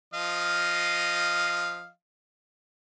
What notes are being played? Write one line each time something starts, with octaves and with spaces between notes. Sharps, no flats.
F3 D#5 F5